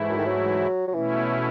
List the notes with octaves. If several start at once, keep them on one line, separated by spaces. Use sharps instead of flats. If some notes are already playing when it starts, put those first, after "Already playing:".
Already playing: G#2 E3 A3 E4
F#2
D#3
F#3
F#3
B2 E3 A3 C#4 E4